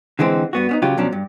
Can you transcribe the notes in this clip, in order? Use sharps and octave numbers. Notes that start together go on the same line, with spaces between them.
D3 E3 G#3 C4
G2 B3 F#4
B3 C#4 D#4
C#3 F#3 F4 G4
B2 F3 F#3 C#4 D4
G2